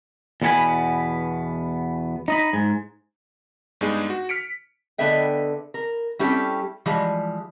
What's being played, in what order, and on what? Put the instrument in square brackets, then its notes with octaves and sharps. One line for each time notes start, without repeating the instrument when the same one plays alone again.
[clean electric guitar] E2 B2 B3 A4 G#5 B5
D#4 D#5 B5
G#2
[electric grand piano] G2 G#3 B3 D4 D#4 G#4
F#4
F6 B6 C#7 D7
[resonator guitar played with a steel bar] D3 B3 A4 D#5 E5 G5
A#4
G3 C4 C#4 E4 G4 A4
E3 F3 G3 G#3